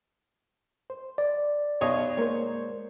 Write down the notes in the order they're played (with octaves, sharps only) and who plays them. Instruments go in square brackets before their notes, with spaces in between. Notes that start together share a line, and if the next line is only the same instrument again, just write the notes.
[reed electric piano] C5
[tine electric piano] D5
[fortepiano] B1 C#5 D#5
[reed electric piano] G#3 A#3 A#4 [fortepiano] C5 C#5